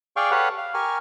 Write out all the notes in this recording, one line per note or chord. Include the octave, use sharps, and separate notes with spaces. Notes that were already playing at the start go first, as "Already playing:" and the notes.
G#4 D5 F5 G5 C#6
G4 A4 B4 C#5 F5 F#5
F5
G4 A#4 G#5 C#6 F6